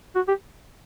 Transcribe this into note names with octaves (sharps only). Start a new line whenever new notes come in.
F#4
G4